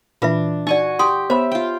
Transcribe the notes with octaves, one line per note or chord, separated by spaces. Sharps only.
A#2 E3 D4 F4 B4 E5
D#4 F#4 D5 G#5 C#6
G4 G5 C6 D#6
B3 C5 C#5 E5 B5
F4 G5